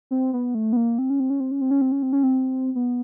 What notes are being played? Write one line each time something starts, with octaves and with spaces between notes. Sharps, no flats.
C4
B3
A3
B3
A#3
C4
C#4
C4
C#4
C4
C#4
C4
C#4
C4
C#4
C4
C#4
C4
B3